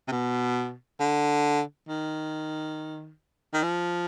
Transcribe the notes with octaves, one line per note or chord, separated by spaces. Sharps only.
C3
B2
D3
D#3
D#3
F3